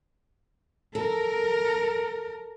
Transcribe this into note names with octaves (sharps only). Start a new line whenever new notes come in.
A4 A#4